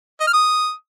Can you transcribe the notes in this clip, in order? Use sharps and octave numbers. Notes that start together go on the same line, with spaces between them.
D#5
F6
D#6